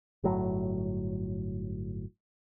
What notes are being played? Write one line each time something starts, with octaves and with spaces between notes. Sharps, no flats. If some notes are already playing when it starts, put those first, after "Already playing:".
G1 A2 F#3